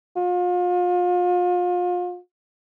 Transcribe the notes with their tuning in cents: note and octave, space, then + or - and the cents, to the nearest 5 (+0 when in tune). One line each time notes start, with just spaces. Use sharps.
F4 +35